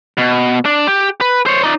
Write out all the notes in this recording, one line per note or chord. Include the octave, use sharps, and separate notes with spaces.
B2
D4
G4
B4
C5 C#5
D#4 D5